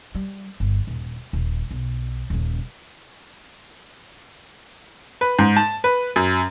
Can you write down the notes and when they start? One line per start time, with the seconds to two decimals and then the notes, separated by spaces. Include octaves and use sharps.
0.15 G3
0.60 G1
0.87 D#1
1.33 D#1
1.71 B1
2.30 D#1 C#3
5.21 B4
5.39 G#2
5.56 A5
5.84 B4
6.16 F#2